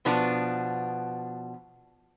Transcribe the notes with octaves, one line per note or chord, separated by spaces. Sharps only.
B2 F3 B3 D4